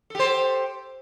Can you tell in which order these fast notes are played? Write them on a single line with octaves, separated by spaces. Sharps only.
A4 G4 C5